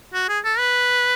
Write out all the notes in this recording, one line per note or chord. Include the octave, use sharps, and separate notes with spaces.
F#4
G#4
A4
B4